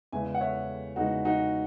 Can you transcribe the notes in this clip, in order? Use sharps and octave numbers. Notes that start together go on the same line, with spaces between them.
E2 C#3 G#3 E5 G#5
F#5
C#5 E5
E2 C#3 G#3 D#4 F#4
D#4 F#4